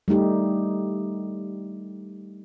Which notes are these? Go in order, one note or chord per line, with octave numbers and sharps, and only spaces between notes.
G3 A3 D#4 G4